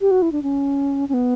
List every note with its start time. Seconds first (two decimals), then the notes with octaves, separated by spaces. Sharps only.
0.01 G4
0.11 F#4
0.22 E4
0.32 D4
0.43 C#4
1.09 C#4
1.14 B3